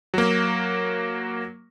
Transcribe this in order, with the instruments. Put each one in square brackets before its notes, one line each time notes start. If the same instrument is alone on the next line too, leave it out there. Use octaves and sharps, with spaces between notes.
[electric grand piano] F#3 A#3